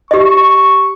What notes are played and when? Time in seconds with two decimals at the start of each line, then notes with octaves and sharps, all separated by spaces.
0.11 G4 D#5 C#6